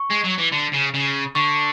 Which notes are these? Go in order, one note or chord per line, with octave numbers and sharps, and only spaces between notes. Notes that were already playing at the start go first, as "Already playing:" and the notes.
Already playing: C#6
G#3
F#3
E3
D3
C#3
C#3
D3 C#6